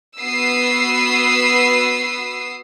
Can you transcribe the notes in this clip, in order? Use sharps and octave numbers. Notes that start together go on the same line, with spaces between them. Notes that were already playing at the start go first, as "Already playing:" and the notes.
B3 F#4 B4 D#6 E6 C7